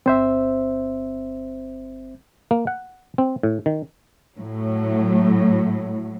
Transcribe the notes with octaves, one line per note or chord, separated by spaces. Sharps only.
G1 C4 C5 E5
A#3
F#5
C4
A2
D#3
A2 F#3